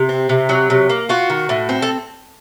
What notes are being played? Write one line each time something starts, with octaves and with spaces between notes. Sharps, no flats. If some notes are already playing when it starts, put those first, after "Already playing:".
Already playing: C3
C4
C3
F#3
C3
A#3
F4 F#4
D#3
A2
C4
A4